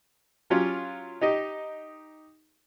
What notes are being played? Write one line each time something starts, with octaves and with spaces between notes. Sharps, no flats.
F#3 C#4 F4 G4
D#4 G4 D#5